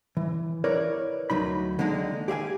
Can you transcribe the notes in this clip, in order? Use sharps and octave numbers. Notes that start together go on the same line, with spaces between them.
E3
E4 A#4 B4 C#5 D5
D2 F#3 D#4 B5
D3 D#3 G#3 A#3 D#4
G4 G#4 E5 G#5